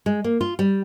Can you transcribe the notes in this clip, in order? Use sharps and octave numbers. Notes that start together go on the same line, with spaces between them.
G#3
A#3
F4
G3